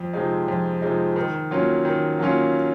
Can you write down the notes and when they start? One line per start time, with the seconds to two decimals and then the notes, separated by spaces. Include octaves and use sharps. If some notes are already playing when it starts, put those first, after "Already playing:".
Already playing: F2
0.13 C3 F3 G#3 D#4
0.48 F2
0.82 C3 F3 G#3 D#4
1.16 D#3
1.51 F#3 A#3 C#4 F4
1.85 D#3
2.19 F#3 A#3 C#4 F4